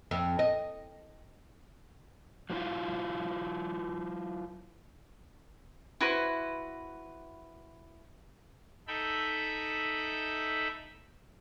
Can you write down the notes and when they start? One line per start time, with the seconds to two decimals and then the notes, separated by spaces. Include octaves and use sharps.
0.11 F2
0.39 D#5
2.50 F#3 A#3 C4 E4 F4
6.01 E4 F#4 B4 C5
8.88 D#4 A4 E5 G5 B5